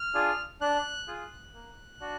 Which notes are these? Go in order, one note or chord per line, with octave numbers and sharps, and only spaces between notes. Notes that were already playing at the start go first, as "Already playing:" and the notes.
Already playing: F6
D4 F4 G#4
D4 F#6
F4 G#4
A#3
D4 F#4